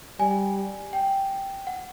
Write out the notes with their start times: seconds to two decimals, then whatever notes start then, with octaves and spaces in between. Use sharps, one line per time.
0.19 G3 G#5
0.93 G5
1.67 F#5